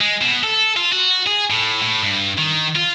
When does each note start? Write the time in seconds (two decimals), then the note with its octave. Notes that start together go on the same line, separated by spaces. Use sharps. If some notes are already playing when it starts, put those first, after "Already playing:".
0.01 G#3
0.22 B2
0.43 A4
0.76 F4
0.92 F#4
1.27 G#4
1.50 A2
1.82 A2
2.02 G2
2.38 D#3
2.75 F4